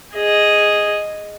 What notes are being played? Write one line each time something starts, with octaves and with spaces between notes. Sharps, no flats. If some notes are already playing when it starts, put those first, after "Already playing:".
G#4 D#5